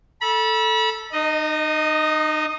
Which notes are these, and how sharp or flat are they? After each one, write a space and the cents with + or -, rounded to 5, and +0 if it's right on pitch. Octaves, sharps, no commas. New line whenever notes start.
A4 +0 B5 -35
D#4 -30 D#5 +0